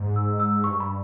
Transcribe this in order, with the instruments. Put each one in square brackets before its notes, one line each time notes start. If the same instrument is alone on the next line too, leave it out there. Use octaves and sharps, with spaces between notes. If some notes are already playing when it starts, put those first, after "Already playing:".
Already playing: [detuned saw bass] G#2
[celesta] E6
E6
[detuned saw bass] G2 [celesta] C#6
[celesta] B5